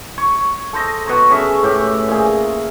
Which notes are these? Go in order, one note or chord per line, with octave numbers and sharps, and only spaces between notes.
C#5
A4 C5 D#5
B2 C#5 A#5
C#4 G#4 A4 E5
A2 G4
A#2 G#4